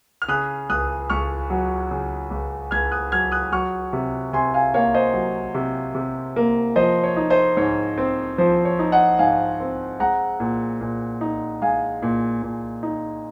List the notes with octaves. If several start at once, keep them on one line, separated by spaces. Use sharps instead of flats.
F6
C#3 D#6 F#6
C#2 D#6 F#6
C#2 C#6 F6
F#3
C#3
C#2
C#2 F6 G#6
D#6 F#6
F#3 F6 G#6
D#6 F#6
F#3 C#6 F6
C3
C3 G#5 C6
F5 G#5
A#3 C#5 F5
C5 D#5
F#3
C3
C3
A#3
F3 C5 D#5
C#5
D#4
C5 D#5
G#2 C#5
C4
F3 C5
C#5
D#4
D#5 F#5
G#2 F5 G#5
C4
G#3 F#5 A#5
A#2
A#2
D#4
G#3 F5 G#5
A#2
A#2
D#4